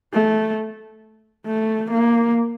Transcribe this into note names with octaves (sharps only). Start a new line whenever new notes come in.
A3
A3
A#3